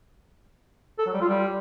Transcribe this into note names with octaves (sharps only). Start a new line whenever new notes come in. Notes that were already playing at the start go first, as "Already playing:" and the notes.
A4
F#3
G3
F4
G3